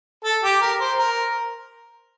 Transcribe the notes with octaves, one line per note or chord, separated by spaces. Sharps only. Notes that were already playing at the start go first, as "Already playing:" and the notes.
A4
G4
A#4
C5
A#4